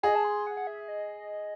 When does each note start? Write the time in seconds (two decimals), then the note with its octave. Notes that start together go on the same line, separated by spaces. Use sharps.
0.03 G#4 D#5
0.15 A5
0.24 C6
0.47 F#5
0.57 F#5
0.67 E5
0.88 D#5